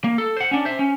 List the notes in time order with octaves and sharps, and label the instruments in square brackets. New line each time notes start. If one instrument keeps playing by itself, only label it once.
[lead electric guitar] A#3
A4
C5 F#5
C#4 D4
C5 E5
C#4